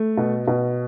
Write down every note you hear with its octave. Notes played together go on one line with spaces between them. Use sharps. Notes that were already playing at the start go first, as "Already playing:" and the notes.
Already playing: A3
B2
B2